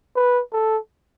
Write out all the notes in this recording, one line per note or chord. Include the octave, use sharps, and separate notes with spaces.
B4
A4